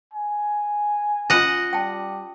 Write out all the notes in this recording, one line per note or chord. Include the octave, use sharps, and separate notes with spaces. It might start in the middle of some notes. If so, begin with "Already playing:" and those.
G#5
C#4 F4 D#5 F#5
G3 G5 A5